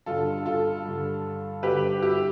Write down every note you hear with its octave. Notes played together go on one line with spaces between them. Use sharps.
G2 D3 F4 A4
F4 A4
G2 D3
G2 D3 G4 B4
E4 G4